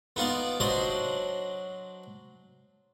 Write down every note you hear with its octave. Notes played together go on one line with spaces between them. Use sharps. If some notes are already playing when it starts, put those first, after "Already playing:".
B3 D#4 F4 D5
F#3 D4 C5 D#5